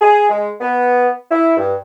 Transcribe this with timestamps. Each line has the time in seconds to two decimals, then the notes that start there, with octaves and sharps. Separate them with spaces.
0.01 G#4
0.30 G#3
0.61 B3
1.31 E4
1.57 G2